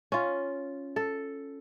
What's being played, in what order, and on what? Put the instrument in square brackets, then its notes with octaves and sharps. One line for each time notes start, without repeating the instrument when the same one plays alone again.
[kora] C#4 F4
A4